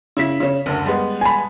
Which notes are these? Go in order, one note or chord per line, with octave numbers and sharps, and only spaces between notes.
C#3 E4 B6
C#3 C#4
F#1 D2
G3 G#3 B3
G#5 A5 B5